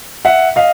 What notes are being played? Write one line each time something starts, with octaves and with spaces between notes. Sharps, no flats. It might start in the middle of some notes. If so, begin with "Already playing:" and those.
E5 F#5
D#5 F5